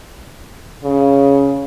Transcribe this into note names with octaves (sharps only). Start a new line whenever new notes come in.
C#3